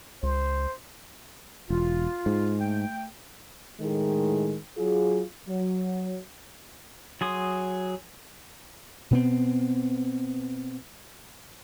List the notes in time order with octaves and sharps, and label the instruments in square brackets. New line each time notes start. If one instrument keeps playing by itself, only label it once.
[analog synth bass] C#2 [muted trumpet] C5
[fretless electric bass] E1 [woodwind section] F4
[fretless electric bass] G#2
[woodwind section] A3 G5
[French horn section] A2 D#3 G#3
F#3 F4 G#4
F#3
[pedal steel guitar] F#3 G#4 C6 D#6
[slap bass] B2 B3 C4